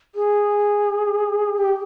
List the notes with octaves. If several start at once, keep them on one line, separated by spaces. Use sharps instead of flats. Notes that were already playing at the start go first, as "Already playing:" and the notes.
G#4
G4